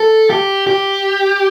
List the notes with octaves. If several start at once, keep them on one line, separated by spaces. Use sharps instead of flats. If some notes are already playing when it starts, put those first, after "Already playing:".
Already playing: A4
G4
G4